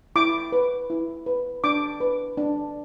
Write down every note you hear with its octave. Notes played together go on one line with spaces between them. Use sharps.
E4 D6
B4
E4
B4
D4 D6
B4
D4